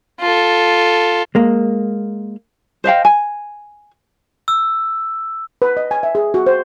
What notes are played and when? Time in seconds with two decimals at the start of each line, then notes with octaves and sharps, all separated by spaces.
0.21 F4 A4
1.35 G#3 A#3
2.84 C5 D#5 F5 G5
3.05 G#5
4.48 E6
5.62 B4
5.77 D#5
5.91 G#5
6.03 E5
6.15 G#4
6.34 F#4
6.46 C5